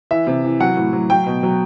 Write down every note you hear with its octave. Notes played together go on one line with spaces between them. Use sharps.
E3 E5
C3
E3
F#3 F#5
A2
F#3
F#3 G5
B2
F#3